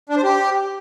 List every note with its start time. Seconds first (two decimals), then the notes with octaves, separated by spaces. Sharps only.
0.09 D4
0.17 C5
0.24 G4